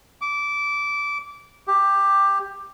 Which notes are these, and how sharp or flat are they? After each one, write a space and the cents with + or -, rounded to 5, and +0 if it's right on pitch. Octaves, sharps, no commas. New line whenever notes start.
D6 -20
G4 +10